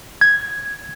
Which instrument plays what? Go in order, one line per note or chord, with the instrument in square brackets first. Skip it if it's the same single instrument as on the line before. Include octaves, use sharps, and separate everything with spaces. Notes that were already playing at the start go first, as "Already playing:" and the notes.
[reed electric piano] G#6